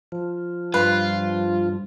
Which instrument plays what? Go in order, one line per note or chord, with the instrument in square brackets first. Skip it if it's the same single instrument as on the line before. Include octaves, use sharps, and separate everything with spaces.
[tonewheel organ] F3
[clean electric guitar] G2 [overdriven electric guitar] F4 [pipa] B4